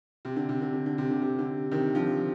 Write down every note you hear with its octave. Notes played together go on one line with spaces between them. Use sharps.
C3
D3
C3
D3
D3
D3
C3
D3
C3
D3
C3 D#3
D3 F3